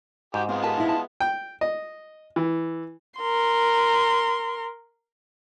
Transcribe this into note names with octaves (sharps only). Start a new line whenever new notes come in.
G#2 F#4 G4 G5
G#3 B3 C4 F4
G4 A#4 B4 A5
D#4 E4
A5
G5
D#5
E3
A#4 C6